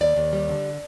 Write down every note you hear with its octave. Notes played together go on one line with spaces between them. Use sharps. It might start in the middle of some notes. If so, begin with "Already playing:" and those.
D#2 D5
D#2
G3
D3